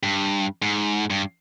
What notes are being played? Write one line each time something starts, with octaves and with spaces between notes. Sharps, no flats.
G2
G#2
G2